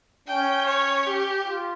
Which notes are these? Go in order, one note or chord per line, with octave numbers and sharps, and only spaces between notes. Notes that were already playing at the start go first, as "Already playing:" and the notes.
C#4 G5
C#5
G4
F4